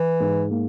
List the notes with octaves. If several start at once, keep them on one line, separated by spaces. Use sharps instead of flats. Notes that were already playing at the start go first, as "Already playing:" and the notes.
Already playing: E3
G#2
A#3